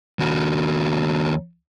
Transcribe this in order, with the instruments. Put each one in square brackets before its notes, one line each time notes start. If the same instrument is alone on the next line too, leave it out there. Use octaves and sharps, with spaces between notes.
[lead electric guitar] D#2 F#4